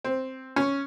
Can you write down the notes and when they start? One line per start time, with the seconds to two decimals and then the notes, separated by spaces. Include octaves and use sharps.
0.04 C4
0.56 C#4